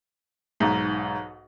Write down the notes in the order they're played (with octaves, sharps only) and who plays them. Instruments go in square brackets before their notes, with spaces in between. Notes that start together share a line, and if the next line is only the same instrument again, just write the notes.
[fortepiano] B1 G#2